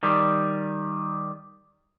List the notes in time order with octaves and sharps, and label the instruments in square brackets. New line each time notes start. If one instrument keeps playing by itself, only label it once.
[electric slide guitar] D#3 G3